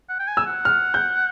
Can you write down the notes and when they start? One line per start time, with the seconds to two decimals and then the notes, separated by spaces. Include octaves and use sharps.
0.09 F#5
0.19 G5
0.28 G#5
0.37 E6
0.46 F#5
0.65 F6
0.94 G6